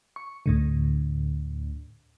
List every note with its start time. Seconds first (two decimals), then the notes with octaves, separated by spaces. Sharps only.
0.16 C#6
0.46 D2 A2 D3